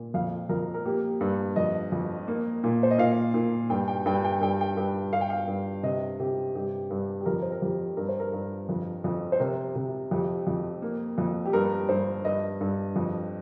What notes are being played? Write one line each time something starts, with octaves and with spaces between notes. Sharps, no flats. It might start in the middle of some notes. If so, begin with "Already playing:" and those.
Already playing: A#2
F2 F5
F2 A#4
A#4
A#3 G4
G2
F2 D#5
F2
A#3
A#2
C5
D#5
A#2 F5
A#2
G2 G5
G5
G2 G5
G5
G2 G5
G5
G2
G2 F5
G5
F5
G2
C3 D#5
C3 G4
G2 G4
G2
G4
F2 A#4
C5
A#4
F2 G4
G2 A#4
C5
A#4
G2
F2
F2
C5
C3 A#4
C3
F2 G4
F2
A#3
F2
G4
G2 A#4
G2 C5
G2 D#5
G2
F2